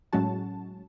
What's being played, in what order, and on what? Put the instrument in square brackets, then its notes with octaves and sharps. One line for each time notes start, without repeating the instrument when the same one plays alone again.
[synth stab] A2 F#3 G#3 C#4 F#4 A5